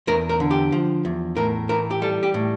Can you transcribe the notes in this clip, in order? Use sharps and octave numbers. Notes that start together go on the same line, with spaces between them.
E2 A#4
A#4
D3
G4
F3
E2
A2 A#4
E3 A#4
G4
G3 A4
G4
A2